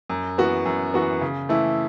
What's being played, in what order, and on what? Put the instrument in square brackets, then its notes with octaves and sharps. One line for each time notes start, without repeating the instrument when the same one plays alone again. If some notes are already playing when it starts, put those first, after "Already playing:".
[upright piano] F#2
E3 B3 F#4
F#2
E3 B3 F#4
C#3
E3 A3 E4